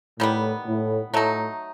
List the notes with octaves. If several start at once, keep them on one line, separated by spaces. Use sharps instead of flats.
A2 D#3 G3 B3
A2
A2 F#3 A3 D#4